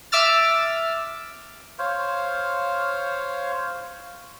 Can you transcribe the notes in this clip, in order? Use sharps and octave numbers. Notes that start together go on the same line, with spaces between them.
E5 D6 E6 F6 A6
C5 C#5 F5